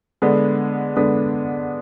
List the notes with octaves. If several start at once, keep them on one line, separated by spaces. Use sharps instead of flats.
D3 G#3 B3 D4
D3 G#3 B3 D4